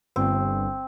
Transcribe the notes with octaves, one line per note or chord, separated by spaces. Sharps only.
G1 C4